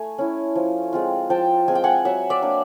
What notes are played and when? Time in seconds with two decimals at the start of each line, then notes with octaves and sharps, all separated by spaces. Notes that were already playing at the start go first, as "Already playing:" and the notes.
Already playing: A3 G#5
0.18 C#4 E4
0.56 F3
0.93 G#3 C4 F4
1.30 F3 G5 A5
1.68 G#3 C4 F4 G#5
1.75 G5
1.84 F#5 G#5
2.05 F#3 E5 F#5
2.30 D5 E5
2.42 A#3 D4